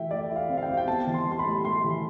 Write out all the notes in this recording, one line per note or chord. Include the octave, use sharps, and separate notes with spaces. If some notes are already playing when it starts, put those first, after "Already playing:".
Already playing: E3 A3 E5 G5
A3 D5
E4
F5
C4
F5
G5
C4
G5
B3 A5
E3
C6
G3
C6
B5
A2
A2 C6
E3